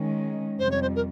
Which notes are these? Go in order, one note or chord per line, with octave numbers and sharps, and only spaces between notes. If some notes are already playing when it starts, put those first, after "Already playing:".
Already playing: D#3 G#3 C#4
F2 C3 G3 C5
C#5
C5
A#4